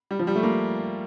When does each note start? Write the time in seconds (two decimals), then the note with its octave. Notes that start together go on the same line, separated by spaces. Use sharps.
0.11 G3
0.19 F3
0.27 G3
0.36 A3
0.43 A#3